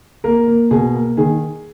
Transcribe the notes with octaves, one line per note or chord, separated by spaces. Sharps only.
A#3 A#4
A#3
B2 G#4
A#3
D#3 G#4